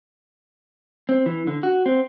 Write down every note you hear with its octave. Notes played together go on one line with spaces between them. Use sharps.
C4
E3
D3
F#4
C4